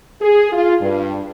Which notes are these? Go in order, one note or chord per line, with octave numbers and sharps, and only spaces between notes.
G#4
F4
G2